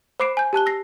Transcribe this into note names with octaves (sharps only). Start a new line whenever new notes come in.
C5 B5 D6 C7 D7 E7
G#5 G6
G4 A5 F#6 G7
E6 A#6 C7